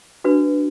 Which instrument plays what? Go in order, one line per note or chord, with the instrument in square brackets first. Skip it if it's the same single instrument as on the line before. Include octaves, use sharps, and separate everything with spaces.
[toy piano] D4 F#4 B4